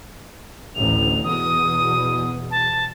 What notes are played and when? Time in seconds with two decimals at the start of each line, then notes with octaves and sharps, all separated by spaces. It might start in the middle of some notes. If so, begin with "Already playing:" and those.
0.75 A1 D2 F7
1.24 E2 B2 D#6
2.51 A5